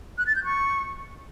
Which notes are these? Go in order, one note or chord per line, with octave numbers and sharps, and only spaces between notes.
F#6
A6
G6
C#6